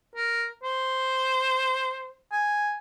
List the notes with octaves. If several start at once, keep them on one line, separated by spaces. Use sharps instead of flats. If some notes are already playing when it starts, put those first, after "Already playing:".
A#4
C5
G#5